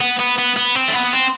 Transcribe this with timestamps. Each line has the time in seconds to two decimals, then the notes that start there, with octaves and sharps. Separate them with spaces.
0.01 B3
0.20 B3
0.39 B3
0.57 B3
0.75 C4
0.88 A3
0.94 B3
1.13 C4